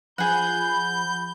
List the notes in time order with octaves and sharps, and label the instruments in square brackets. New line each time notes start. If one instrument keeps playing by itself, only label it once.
[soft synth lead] F3 [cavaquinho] G#4 F#5 [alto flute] B5 [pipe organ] G6